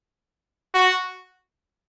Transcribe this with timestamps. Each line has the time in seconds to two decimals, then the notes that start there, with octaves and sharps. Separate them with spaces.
0.74 F#4